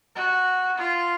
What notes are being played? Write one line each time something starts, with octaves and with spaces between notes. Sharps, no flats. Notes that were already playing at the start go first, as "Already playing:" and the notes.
F#4
F4